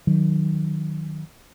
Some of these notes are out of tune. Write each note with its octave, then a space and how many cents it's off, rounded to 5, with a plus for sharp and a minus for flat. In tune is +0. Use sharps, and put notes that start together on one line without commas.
D#3 -5 F#3 -15